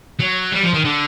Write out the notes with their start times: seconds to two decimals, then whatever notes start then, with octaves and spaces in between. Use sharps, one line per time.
0.19 F#3
0.52 G3
0.63 F3
0.74 D#3
0.85 D3